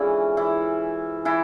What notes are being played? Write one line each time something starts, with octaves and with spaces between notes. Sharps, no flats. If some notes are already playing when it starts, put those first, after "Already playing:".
Already playing: D3 E3 F3 G#3 C#4 E4
E3 E4
E3 E4